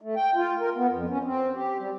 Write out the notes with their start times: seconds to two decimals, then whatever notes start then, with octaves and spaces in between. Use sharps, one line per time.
0.01 A3
0.16 G5
0.35 F4
0.60 A#4
0.76 B3
0.89 F2
1.09 C#4
1.24 C4
1.55 G4
1.79 G3